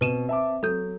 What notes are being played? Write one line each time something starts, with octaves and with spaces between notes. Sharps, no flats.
B2 C4 B4 D#7 E7
E5 A5 D6
F#3 A4 G6